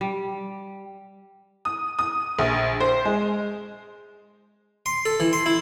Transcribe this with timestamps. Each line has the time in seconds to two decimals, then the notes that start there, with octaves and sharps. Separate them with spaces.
0.01 G3
1.65 D#6
1.99 D#6
2.39 A#1
2.80 C5
3.05 G#3
4.86 C6
5.06 A4
5.20 E3
5.33 C6
5.46 E4